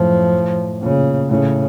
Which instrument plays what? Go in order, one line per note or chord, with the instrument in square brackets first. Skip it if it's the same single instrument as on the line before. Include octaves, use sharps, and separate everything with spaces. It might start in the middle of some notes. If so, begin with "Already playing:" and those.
Already playing: [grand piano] F#2 A2 [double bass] F3
[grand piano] A#2 [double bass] C#3
[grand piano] A2 [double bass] C#3